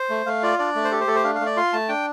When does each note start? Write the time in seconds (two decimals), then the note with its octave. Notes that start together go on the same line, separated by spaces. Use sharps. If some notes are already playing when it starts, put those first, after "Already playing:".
Already playing: C5
0.10 A3
0.26 A3 F5
0.43 F4 D5
0.59 D4 D5
0.75 A3
0.85 C5
0.91 G4 A4
1.00 C5
1.07 A3 A4
1.15 C5
1.24 D4 F5
1.35 F5
1.41 A3
1.46 D5
1.57 F4 C6
1.73 A3 A5
1.89 D4 G5